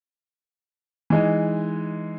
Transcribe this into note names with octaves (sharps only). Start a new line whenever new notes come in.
E3 G#3 D#4